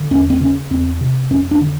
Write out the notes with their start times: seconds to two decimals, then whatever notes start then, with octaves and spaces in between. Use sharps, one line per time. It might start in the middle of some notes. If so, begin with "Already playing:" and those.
Already playing: D3
0.11 E2 C#4
0.30 C4
0.41 C#3 C#4
0.70 E2 C4
1.01 C3
1.30 F2 C#4
1.51 D4
1.61 D3